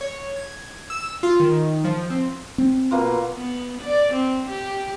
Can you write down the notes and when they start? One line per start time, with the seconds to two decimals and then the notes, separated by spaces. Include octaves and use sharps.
0.01 C#5
0.36 G#6
0.90 E6
1.23 F4
1.40 D#3
1.84 F3
2.10 C4
2.58 C4
2.91 B2 A#3 F4
3.35 B3
3.82 D5
4.14 C4
4.50 G4